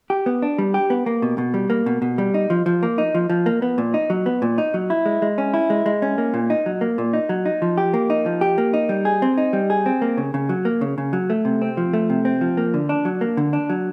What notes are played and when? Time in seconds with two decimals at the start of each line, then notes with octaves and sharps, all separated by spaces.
0.10 G4
0.26 B3
0.42 D4
0.58 G3
0.74 G4
0.90 B3
1.06 A#3
1.22 B2
1.38 B2
1.54 G3
1.70 A#3
1.86 B2
2.02 B2
2.18 G3
2.34 D#4
2.50 F3
2.66 F3
2.83 A#3
2.98 D#4
3.15 F3
3.30 F3
3.46 A#3
3.62 B3
3.78 A#2
3.94 D#4
4.10 F#3
4.26 B3
4.42 A#2
4.58 D#4
4.74 F#3
4.90 E4
5.06 G#3
5.22 G#3
5.38 C#4
5.54 E4
5.70 G#3
5.86 G#3
6.02 C#4
6.18 A#3
6.34 A#2
6.50 D#4
6.66 F#3
6.81 A#3
6.98 A#2
7.13 D#4
7.29 F#3
7.46 D#4
7.62 F3
7.78 G4
7.94 A#3
8.10 D#4
8.26 F3
8.41 G4
8.58 A#3
8.74 D#4
8.89 G3
9.05 G#4
9.22 C4
9.38 D#4
9.53 G3
9.70 G#4
9.86 C4
10.02 A#3
10.18 C#3
10.34 C#3
10.49 F#3
10.65 A#3
10.81 C#3
10.98 C#3
11.13 F#3
11.30 A3
11.45 C3
11.62 C4
11.77 F3
11.93 A3
12.10 C3
12.25 C4
12.41 F3
12.57 A#3
12.74 D3
12.89 D4
13.05 F#3
13.21 A#3
13.37 D3
13.53 D4
13.70 F#3